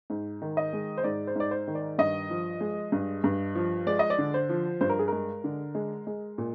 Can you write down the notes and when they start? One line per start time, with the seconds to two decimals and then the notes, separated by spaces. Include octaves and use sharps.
0.10 G#2
0.42 D#3
0.57 D#5
0.73 G#3
0.98 C5
1.04 G#2 D5
1.27 C5
1.36 G#2 D5
1.51 C5
1.68 D#3
1.75 D5
1.98 G2 D#5
2.30 F3
2.61 G#3
2.92 G2
3.24 G2
3.55 F3
3.86 G#3 D5
3.99 D#5
4.10 D5
4.18 D3
4.34 C5
4.49 F3
4.81 G2 C5
4.89 A#4
4.99 G#4
5.08 G#3 A#4
5.44 D3
5.75 G#3
6.07 G#3
6.38 A#2